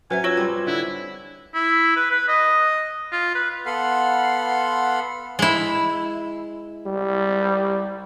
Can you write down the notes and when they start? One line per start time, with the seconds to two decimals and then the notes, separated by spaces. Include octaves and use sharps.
0.10 F#3 C#4 B4 C5 E5 G#5
0.24 F4 C#5 C#6 E6 E7
0.37 G3 C4 G#6
0.67 D3 E4
1.54 E4
1.96 B4
2.11 B4
2.28 D#5
3.12 F4
3.35 B4
3.66 B3 A4 F5 F#5 B5 C6
5.39 G#3 E4
6.86 G3